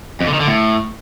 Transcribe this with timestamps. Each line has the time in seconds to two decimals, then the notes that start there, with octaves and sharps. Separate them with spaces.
0.21 F2
0.27 D3
0.34 D#3
0.40 D3
0.47 A2